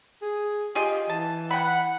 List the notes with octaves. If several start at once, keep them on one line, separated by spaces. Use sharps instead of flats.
G#4
F4 G4 G#4 D#5
E3 A5
F#5 G5 B5